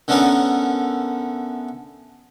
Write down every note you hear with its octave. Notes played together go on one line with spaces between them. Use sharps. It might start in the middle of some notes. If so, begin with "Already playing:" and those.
D3 A3 B3 C#4 A#4